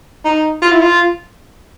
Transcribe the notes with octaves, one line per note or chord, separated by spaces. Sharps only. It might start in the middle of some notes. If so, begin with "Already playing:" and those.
D#4
F4
E4
F4